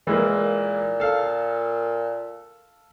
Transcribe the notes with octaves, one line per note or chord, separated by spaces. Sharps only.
A#2 E3 G#3 A#3
A4 F5